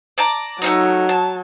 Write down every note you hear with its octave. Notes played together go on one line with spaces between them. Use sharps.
D5 A5 A#5
F#3 A3 C#4 D#4
A5